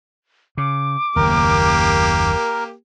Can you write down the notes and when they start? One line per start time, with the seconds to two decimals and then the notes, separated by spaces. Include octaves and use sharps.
0.58 C#3 D6
1.16 F#1 D#2 A#3 G4 A#4